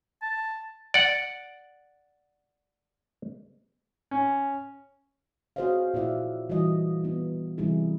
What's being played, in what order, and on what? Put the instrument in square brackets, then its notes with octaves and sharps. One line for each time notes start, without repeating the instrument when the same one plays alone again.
[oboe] A5
[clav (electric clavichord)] D5 F#5
[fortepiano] C#4
[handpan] F#4 G#4 C5 C#5 D#5 F5
A#2 E4 F4 D5 E5 F#5
E3 G3 F4 F#4 D#5
B3 D#4
C3 E3 G3 D#4 E4 G#4